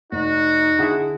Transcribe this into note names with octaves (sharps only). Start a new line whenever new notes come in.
F1 D#4 F#4
D3 E4 G#4 F#5 D#6